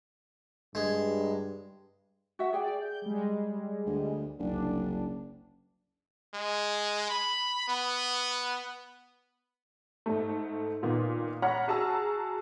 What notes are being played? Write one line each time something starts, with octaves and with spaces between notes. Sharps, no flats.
G2 G#3
F#4 E5 F#5
G#4 D5 G5
G6
G3 G#3
D2
F#1 C2 D4
G#3
B5
B3
G#2 A3
A#2 D#3 B3
C#5 F#5 A#5 B5 F6
F#4 G#4 A5 A#5 E6